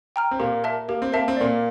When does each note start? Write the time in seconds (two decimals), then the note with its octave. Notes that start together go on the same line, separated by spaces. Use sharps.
0.16 G5 A#5 F6
0.31 C4
0.40 A#2 A#3 G4
0.64 A#4 E5 A5
0.88 A#3 G4
1.02 C4
1.12 A#3 A#4 E5 A5
1.28 C4
1.37 A#2 A#3 D5